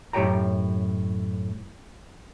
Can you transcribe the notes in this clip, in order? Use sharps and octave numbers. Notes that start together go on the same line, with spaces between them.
F#2 A2 G4 C#5 G5 A#5